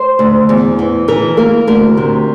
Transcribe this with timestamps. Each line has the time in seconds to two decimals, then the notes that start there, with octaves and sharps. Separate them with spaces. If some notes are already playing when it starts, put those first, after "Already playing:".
Already playing: C5
0.19 D2
0.49 E2
0.79 E3
1.08 E3 A#4
1.37 A#3 A#4
1.67 D2 A#4
1.97 C3